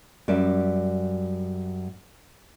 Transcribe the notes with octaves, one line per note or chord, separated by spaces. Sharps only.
F#2 G3 C#5 D5 E5